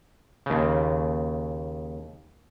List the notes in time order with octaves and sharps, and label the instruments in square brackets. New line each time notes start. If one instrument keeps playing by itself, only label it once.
[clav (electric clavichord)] D#2 C#3